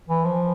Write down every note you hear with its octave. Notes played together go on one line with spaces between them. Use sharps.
E3
F3